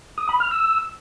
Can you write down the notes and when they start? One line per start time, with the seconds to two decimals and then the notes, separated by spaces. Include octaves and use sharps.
0.18 D#6
0.29 B5
0.40 F6
0.51 E6